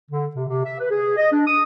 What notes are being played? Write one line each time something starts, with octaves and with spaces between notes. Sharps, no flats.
D3
C3
C3
E5
B4
G#4
D#5
D4
D#6